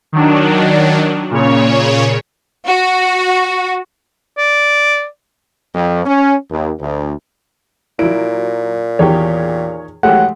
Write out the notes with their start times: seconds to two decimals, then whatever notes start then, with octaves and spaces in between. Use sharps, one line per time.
0.13 D#3 F#3 D4
1.31 A#2 C#3 C#5
2.67 F#4
4.38 D5
5.74 F2
6.05 C#4
6.50 D#2
6.79 D2
7.99 A#2 F#3 E4 D7
8.99 E2 D#3 G4 G#4 C#5
10.03 E3 F#3 G#3 A3 G4 F#5